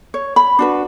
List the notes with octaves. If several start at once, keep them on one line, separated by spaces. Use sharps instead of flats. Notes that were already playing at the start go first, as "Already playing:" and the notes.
C#5
B5
D4 F#4 B4